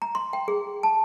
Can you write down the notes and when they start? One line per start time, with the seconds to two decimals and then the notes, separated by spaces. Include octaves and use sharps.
0.02 A#5
0.15 C6
0.33 G5
0.48 G#4
0.83 A5